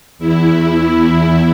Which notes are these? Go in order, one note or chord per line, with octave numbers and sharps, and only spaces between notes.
E2 E4